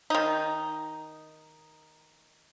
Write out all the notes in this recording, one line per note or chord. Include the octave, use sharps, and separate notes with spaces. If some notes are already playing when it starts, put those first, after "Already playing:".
D#3 D#4